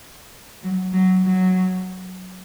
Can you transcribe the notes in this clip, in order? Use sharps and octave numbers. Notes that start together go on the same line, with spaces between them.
F#3
F#3
F#3